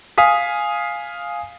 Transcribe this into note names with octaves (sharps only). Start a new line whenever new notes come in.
F5 G#5 D#6 B6